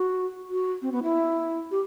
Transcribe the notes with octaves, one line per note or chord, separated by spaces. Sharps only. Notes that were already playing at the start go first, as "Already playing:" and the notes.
Already playing: F#4
F#4
C4
B3
E4
G4